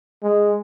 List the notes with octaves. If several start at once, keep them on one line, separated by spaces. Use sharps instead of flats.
G#3